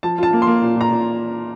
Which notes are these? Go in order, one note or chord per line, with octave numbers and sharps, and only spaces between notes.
F3 A5
F4 A5
A#3
C6
A#3
A#2
A#2 A#5
A#2